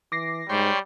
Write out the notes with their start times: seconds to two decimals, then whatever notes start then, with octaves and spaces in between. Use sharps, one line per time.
0.12 E3 D6 A#6 C7
0.49 G#2 G3 C#5 G5 C6